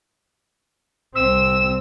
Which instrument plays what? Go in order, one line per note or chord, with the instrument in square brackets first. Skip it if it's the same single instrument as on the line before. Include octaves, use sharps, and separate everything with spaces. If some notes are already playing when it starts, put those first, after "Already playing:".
[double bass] C2 C4 [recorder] E6